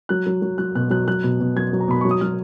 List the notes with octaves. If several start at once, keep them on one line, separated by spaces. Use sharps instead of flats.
F#3 F#6
F#3
F#3
F#3 F#6
B2 F#6
F#3 F#6
F#3 F#6
B2
B2
F#3 G#6
F#3
A#5
B2 B5
F#3 C#6
D#6
F#3 F6